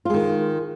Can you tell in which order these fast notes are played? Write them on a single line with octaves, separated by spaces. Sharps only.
F4 G#3 D#3